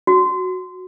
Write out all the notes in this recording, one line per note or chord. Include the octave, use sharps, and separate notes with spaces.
F#4